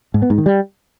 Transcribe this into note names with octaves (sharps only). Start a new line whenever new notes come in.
G#2
B3
G#2
D#3
G3